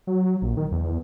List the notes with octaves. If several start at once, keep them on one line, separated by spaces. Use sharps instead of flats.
F#3
A#1
D#3
E2